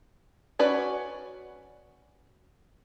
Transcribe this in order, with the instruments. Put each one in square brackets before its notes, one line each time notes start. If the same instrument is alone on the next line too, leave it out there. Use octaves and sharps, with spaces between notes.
[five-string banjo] C#4 F#4 B4 D5